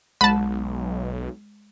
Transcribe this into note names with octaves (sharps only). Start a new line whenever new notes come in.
B1 G#3 A5 B5